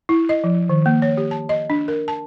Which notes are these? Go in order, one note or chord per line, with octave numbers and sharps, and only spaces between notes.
E4
D#5
F3
D#3
A#3
C#5
G4
A5
D#5
D4
A#4
A5